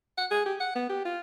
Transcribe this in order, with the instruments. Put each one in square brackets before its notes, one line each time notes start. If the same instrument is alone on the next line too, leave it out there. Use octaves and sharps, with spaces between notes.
[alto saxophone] F#5
G#4
G4
F#5
B3
G4
F4